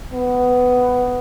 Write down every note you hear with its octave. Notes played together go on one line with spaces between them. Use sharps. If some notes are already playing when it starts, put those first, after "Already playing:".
B3